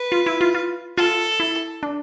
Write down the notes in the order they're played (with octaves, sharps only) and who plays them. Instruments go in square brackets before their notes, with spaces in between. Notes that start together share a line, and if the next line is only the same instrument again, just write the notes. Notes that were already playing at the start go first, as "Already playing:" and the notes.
Already playing: [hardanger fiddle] B4
[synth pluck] F4
E4
F4
F4
[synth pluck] F4 [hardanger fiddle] A4
[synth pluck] E4
D4